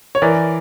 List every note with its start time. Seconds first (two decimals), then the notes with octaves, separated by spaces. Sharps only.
0.15 C#5
0.22 E3 A#4 D5